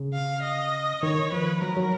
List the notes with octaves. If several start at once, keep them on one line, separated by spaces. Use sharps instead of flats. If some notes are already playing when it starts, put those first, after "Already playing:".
Already playing: C#3
F5
D#5
D#3 C#5
F3 B4
F#3 A#4
F#3